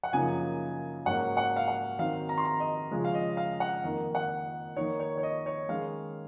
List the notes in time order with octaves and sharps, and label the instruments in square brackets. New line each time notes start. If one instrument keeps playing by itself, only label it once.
[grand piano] F#5
F#2 C#3 F3 A#3 D#4 G#5
G#2 F#3 A#3 C#4 F#5
F#5
F5
F#5
D#3 F#3 C4 D#4 F5
A#5
C6
A#5
D#5
C#3 F3 G#3 C#4
F5
D#5
F5
F#5
F2 D#3 A#3 D#4
F#5
D#3 A#3 D#4 C#5
C#5
C#5
D#5
C#5
D#3 G#3 C#4 F5